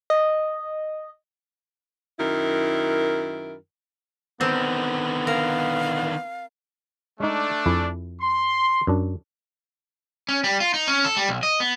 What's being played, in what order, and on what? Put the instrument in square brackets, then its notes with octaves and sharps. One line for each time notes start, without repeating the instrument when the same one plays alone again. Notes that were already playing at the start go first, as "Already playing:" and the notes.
[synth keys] D#5
[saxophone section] F#2 D#3 E4 A#4
[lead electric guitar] D3 D#3 [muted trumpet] B3 [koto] C4
[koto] A#4 [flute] F5
[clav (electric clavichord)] G#3 D#4 [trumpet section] A3 D4
[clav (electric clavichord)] F2 E4 G#4
[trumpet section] C6
[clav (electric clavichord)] F#2 D4
[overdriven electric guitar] C#4
G3
F4
D#4
C#4
A4
G3
B1
D#5
B3